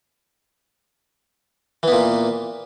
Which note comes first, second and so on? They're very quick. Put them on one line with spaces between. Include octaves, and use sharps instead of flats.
E3 B3 A#2